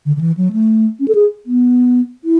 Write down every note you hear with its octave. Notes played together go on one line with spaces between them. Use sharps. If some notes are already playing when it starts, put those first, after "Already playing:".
D3
D3
E3
F#3
A3
C#4
A4
G#4
B3
E4